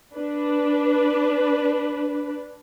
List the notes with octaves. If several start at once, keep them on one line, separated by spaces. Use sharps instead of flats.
D4 B4